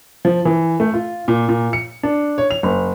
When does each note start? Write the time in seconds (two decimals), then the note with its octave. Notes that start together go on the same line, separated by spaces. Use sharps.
0.25 F3
0.45 E3
0.80 A3
0.94 F4
1.28 A#2
1.49 A#2
1.73 C#7
2.03 D4
2.38 C#5
2.51 F7
2.63 F#1